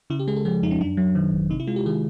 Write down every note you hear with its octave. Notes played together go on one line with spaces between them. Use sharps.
C#3 E4
G4
G#3 G#4
A4
F3 G#4
F2 D#4
C#4
F#2 D4
F#3
D#3
G#1
C3 D#4
E4
G#3 F4
G4
D#3 G#4